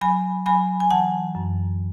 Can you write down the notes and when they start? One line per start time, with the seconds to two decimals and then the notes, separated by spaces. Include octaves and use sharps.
0.01 F#3 G#5 B5
0.46 F#3 G#5 B5
0.80 G#5
0.90 E3 F#5 A5
1.35 F#2